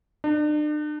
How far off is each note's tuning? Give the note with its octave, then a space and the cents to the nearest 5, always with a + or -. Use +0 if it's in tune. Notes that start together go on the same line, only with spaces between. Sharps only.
D4 +40